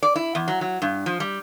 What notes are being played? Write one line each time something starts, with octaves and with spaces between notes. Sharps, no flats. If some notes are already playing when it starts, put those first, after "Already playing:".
D5
E4
E2
F#3
F#3
G2
F3
G3